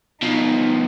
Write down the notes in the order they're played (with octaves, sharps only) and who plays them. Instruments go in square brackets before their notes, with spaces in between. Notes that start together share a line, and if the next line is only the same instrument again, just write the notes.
[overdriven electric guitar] B2 F3 [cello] D#4